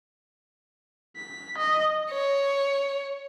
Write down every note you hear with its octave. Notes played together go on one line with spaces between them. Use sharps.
B6
D#5
C#5